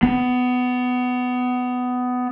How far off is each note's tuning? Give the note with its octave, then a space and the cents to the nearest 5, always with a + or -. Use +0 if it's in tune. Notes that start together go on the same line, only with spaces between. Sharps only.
B3 +15